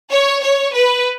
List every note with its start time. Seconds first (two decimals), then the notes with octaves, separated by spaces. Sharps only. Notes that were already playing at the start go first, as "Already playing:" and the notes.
0.11 C#5
0.43 C#5
0.74 B4